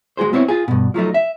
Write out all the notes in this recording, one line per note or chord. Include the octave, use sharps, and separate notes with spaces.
G#3 F#4 G#4 C5
B3 C4 E4 C5 C#5
F4 G#4
G2 B2
F3 F#3 A3 D#4
E5